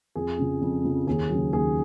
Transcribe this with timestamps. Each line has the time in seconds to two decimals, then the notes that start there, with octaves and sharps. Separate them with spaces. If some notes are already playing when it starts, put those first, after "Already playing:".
0.15 F2 G#4
0.38 C#3 F3
0.61 F2
0.84 C#3 F3
1.07 D#2 G#4
1.30 C#3 F#3
1.53 D#2 G#4